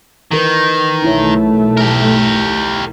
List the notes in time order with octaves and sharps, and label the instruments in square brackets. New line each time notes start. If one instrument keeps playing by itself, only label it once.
[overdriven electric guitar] D#3 [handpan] E3 A#4 B4
[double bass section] B1 A3 [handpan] D#4 E4 C#5
[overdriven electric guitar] G4 A#4